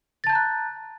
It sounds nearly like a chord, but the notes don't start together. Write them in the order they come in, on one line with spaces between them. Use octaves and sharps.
A6 A5 G6 A#5 F#6